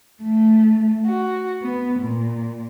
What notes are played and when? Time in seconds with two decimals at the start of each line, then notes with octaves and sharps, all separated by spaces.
0.24 A3
1.07 F#4
1.63 B3
2.01 A#2